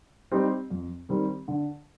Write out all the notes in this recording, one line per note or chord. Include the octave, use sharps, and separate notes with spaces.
G3 C4 D#4 G4
F2
D#3 G3 C4
D3